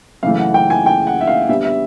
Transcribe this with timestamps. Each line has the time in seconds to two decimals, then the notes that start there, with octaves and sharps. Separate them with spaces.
0.23 F#2 C#3 E3 A3 F5
0.38 F#5
0.54 G5
0.70 G#5
0.86 G5
1.07 F#5
1.21 E5
1.27 F5
1.49 D3 G3 B3 E5
1.65 E5